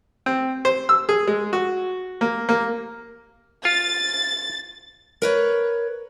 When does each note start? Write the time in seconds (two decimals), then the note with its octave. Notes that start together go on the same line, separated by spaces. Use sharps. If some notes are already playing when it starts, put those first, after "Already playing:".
0.26 C4
0.65 C5
0.89 E6
1.09 G#4
1.27 G#3
1.53 F#4
2.21 A#3
2.49 A#3
3.65 F4 A6
5.22 A#4 B4 C#5